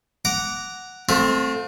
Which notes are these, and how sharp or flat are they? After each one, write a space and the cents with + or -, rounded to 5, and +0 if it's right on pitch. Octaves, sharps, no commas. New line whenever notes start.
F#5 +0 A#5 +0 D6 -10
A3 +0 C4 +0 F4 +40